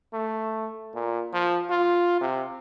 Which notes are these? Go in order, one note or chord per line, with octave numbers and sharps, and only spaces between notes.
A3
A#2
F3
F4
C3